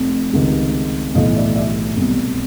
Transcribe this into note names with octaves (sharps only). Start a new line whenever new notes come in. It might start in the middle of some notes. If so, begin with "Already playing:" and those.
Already playing: F1 F2 C3
C#2 C3 D#3
B1 A2 E3 D#5 F5
D5 E5
D5 E5
C2 B2